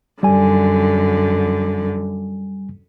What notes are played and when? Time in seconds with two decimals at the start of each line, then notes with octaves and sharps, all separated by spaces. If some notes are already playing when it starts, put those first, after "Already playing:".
0.23 F#2 D3 G3 G#5